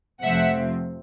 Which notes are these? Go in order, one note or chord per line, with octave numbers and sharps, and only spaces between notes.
F2 C3 F3 A3 C4 E5 F#5